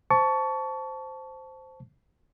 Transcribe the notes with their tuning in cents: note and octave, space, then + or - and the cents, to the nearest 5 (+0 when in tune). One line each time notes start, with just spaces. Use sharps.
C5 -5 A5 +0 C#6 +25